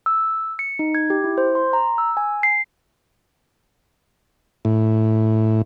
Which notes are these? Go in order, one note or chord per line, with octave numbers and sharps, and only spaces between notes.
E6
C#7
D#4
G#6
G4
E4
C5
C6
A#5
E6
G#5
C7
A2